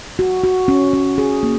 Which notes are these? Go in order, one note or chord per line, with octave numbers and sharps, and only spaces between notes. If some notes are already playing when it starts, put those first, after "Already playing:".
F#4
F#4
C#4
C#4
G#4
A#3